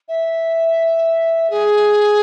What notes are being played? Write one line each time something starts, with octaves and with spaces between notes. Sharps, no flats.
E5
G#4